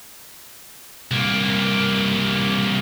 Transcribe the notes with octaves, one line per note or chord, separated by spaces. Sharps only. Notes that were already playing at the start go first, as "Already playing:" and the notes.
C2 A#3